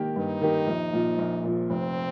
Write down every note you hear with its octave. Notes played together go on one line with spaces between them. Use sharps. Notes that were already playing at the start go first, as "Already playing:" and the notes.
Already playing: D#3 A#3 G4
G2 D#4
D#3 A#3 G4
A#1
A#2 F3
A#1
A#2 F3
F1 C4